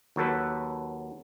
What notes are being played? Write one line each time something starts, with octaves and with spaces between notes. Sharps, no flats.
D#2 F#3 A4 B4